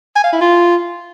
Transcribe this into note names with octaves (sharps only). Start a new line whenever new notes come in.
G#5
F5
E4
F4